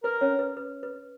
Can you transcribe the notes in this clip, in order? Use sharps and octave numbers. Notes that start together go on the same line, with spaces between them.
A#4 B4
C#4 C#5
B4
B4
B4